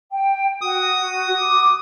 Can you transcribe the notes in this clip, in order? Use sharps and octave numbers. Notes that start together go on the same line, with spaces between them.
G5
F#4 D#6
D6